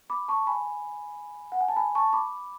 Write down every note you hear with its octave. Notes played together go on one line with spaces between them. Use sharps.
B5 D6
A5 C#6
G#5 B5
F#5
G#5
A5
G#5 B5
A5 C#6
B5 D6